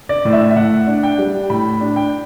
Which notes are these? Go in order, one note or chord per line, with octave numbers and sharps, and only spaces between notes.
D5
A2
E5
E5
A2 F#5
D4
G5
G3
A2 B5
D4
G5